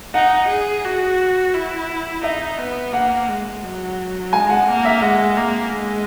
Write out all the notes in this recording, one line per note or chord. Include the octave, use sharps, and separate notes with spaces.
D#4 F#5
G#4
F#4
E4
D#4 E5
B3
A#3 F#5
G#3
F#3
G#3 G#5
F#5
A#3
E5
G#3 F#5
A#3
G#3